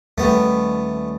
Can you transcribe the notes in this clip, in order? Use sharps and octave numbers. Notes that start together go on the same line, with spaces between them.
D#2 G3 A3 B3